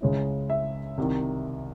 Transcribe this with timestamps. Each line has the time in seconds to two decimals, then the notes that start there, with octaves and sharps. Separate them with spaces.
0.01 C#2 C#3 G#3 C#4 E4
0.50 E5
0.98 C2 C3 D#3